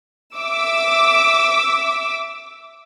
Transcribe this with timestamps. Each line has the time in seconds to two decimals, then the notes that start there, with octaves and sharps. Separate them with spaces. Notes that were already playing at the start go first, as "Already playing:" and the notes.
0.37 E5 D6 E6